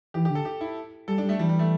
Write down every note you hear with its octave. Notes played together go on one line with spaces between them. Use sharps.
E3 G4
G4
D3
A4
G4
E4
G3 A4
D4
G3
A3
E3 G3
G3
A3